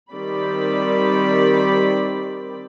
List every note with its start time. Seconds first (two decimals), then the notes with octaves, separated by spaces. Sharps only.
0.11 D#3 G3 C4 D5 B5